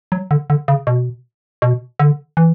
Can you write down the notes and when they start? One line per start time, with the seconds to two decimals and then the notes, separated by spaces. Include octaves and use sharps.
0.12 F#3
0.31 D3
0.50 D3
0.68 C#3
0.87 B2
1.62 B2
1.99 D3
2.37 E3